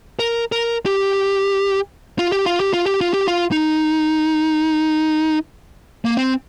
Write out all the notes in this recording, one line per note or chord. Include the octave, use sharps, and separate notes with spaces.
A#4
A#4
G4
F4
G4
F4
G4
F4
G4
F4
G4
F4
D#4
A#3
C4